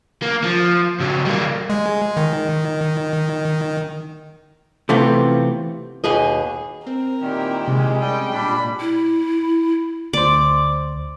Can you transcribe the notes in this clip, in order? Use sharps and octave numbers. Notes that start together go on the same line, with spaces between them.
A#3
F3
C#2 F#3
G3 A#3
G#3
D#3
C3 E3 A3 B3 C4 F4
D#2 B2 G#4 D#5
C4 A#4
A#2 D#3 E4 G4
C3 G#3
G3 C#4 G5
A#2 G3 D4 B5
E4
D2 C5 D5